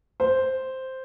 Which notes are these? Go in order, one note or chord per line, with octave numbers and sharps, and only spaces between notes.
C5